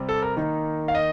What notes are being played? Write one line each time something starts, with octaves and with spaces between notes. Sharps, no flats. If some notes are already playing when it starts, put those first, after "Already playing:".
Already playing: C3 G3 C4
A4
A#4
D#3 A#3 D#4
F5
D#5